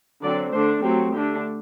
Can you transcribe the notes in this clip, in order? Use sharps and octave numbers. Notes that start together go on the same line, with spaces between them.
D3 F#3 C4 D5
D3 A3 D4 C5
F#3 A3 C4 G4
D3 A3 D4 G4